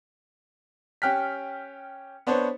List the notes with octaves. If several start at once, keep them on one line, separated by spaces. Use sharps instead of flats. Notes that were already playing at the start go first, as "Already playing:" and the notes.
C#4 G4 G5 F6 F#6 B6
B3 D4 C5 C#5